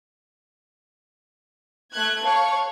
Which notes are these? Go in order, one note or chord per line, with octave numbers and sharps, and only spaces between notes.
A3 F#6 G#6
C#5 F5 A5 C#6